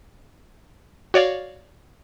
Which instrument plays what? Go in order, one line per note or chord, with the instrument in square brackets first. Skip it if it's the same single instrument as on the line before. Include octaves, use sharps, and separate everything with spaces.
[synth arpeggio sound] F#4 C#5 D5 F5